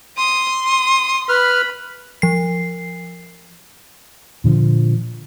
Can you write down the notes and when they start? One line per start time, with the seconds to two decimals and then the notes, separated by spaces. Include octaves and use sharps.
0.17 C6 D#6
0.66 D#6
1.29 B4 B5 F6
2.22 F3 C7
4.44 A#2 D3 F3